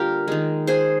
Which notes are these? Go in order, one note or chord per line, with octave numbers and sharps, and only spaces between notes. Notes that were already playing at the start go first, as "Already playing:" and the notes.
Already playing: D3 G3 A#3 D4 F4 G4 A#4
D#3 G#3
G#4 C5